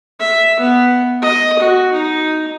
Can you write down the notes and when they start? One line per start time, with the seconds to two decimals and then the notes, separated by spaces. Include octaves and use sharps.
0.20 E5
0.60 B3
1.22 D#5
1.59 F#4
1.93 D#4